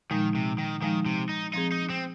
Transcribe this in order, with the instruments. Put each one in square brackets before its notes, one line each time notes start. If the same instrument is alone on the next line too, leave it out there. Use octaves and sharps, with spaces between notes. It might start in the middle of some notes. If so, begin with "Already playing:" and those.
[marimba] A#2 F3 G#3 D#4 [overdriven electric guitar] D#3
[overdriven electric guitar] C3
D#3
[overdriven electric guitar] D#3 [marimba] F3 G#3 D#4
[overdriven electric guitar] C3
D#4
[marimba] F3 C4 G#4 [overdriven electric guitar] D#4
[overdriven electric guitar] D#4
C4